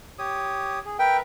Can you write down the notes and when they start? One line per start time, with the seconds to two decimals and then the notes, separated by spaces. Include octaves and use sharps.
0.19 G4 C#5 D#6
0.86 G#4
0.99 A#4 B4 E5 G5